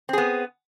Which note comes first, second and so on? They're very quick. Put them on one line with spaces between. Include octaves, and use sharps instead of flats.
C4 G#4 B3